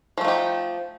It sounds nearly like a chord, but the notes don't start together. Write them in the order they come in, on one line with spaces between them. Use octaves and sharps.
F3 A3 D#4 G4